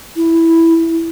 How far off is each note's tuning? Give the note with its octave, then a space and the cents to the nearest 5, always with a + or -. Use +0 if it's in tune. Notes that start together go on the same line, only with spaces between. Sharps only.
E4 +0